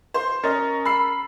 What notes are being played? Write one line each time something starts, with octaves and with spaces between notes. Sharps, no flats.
C5 C6
C#4 A#4 D#5 A#5 A6
B5 E6 C7